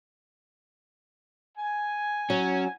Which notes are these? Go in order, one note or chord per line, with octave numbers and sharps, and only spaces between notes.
G#5
F#3 C#4